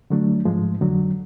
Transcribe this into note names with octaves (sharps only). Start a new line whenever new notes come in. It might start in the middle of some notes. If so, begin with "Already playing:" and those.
D3 F#3 A3 D4
G#2 F3 G#3
F2 D3 F#3